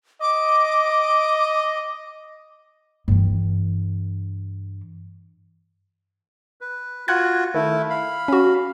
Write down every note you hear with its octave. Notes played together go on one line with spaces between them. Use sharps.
D#5 D6
G2 E3
B4
F4 F#4 F#5 F#6 G#6
D#3 A3 E4
F5 B5
C#4 F#4